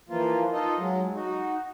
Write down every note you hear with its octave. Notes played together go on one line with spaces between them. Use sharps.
E3 F3 A#3 F4
D#4 F4 A4 D#5
F#3 G#3
D#4 F#4